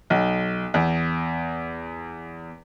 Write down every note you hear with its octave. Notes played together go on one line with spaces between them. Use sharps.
B1
E2